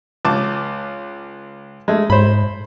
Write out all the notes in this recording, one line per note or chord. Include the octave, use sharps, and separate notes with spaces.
C#2 A5 D6
G#3 A3
G#2 C5 B5